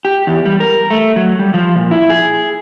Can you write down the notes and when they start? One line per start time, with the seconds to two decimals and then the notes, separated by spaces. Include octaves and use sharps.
0.05 G4
0.27 E2
0.46 G3
0.60 A#4
0.90 A3
1.16 F#3
1.39 G3
1.54 F3
1.76 A#2
1.91 E4
2.10 G#4